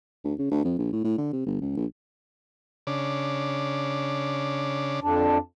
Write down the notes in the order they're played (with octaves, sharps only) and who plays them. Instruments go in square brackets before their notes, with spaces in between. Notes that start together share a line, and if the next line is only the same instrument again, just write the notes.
[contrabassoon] D2
C#3
D2
F2
A#1
A2
A2
D3
C3
G1
C#2
A#1
[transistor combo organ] C#3 D4
[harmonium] F2 D4